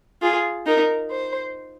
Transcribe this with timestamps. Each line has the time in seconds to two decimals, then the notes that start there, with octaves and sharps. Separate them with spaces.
0.22 F4 G#4
0.66 D#4 A#4
1.10 C5